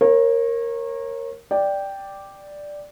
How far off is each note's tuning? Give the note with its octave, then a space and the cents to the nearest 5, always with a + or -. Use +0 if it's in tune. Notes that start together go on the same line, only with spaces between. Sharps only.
A#4 +0 C#5 -30
D5 +0 G5 +0